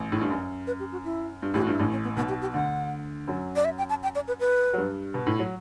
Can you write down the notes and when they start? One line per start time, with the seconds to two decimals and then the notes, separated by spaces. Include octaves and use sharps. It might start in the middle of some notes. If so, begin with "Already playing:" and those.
Already playing: A1
0.12 A2
0.21 G2
0.31 F#2
0.67 B4
0.80 G4
0.92 F#4
1.04 E4
1.42 G2
1.54 A1 A2 G4
1.62 F#4
1.67 G2 E4
1.79 A1 A2 D4
1.91 C#4
2.04 B3
2.16 B1 B2 B3
2.29 G4
2.42 G4
2.53 D2 D3 F#5
3.28 F#2 F#3
3.56 D5
3.65 E5
3.78 G5
3.90 A5
4.03 G5
4.15 D5
4.28 B4
4.40 B4
4.73 F#3
4.77 G2 G3
5.14 B2 B3
5.27 A2 A3
5.39 F#3